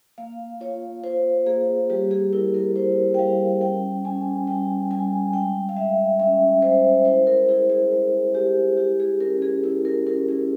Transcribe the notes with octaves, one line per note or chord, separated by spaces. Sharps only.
A#3 F5
F4 C#5
F4 C5
A#3 G#4
G3 G4
G#4
E4 A#4
A#4
E4 C5
G5
G3 F5
C#4 G5
C#4 G#5
G3 G5
G3 G#5
G#3 G5
F5
G#3 E5
C#4 E5
G#3 C5
E4 C5
A#4
E4 G#4
G#4
G#3
G#3 G4
E4 G4
G#4
C#4 A#4
G#4
E4 G#4
A#4
C#4 A#4
G#4